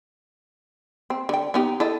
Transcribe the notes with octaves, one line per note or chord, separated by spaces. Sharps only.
C4
D3 G5
B3 D#4 G4
E4 A4 D#5